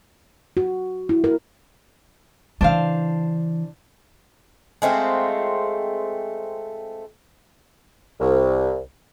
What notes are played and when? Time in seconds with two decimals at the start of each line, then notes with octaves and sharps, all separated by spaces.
0.57 F#4
1.09 E4
1.24 A#4
2.61 C#3 E3 D4 C5 F5
4.82 G#3 A3 C4 F4
8.20 C2